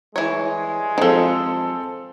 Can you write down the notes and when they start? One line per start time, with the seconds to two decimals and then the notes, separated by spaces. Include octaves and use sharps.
0.16 E3 G3 G#3 C#5
0.98 D#3 F3 C4 A4